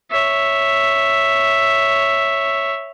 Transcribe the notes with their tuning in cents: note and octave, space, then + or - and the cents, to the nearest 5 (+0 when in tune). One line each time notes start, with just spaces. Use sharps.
C#5 +0 E5 +0